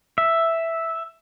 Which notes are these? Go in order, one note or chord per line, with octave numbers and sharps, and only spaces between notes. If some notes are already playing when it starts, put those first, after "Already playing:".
E5